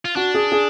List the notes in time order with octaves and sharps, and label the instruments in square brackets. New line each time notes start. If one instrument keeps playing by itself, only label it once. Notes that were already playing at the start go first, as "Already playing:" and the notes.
[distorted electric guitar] F4
[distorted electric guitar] D4 [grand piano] F#4
[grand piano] G#4
G#4